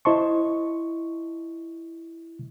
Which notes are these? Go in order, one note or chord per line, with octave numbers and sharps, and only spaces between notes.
E4 C5 D#5 A5 C6 C#6